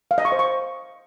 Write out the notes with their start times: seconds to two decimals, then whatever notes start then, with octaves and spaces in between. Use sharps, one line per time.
0.11 F5
0.18 D#5
0.25 C#6
0.32 C5
0.39 C#6